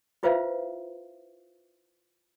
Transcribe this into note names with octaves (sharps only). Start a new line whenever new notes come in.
E4 F4 B4 C5 E5 F5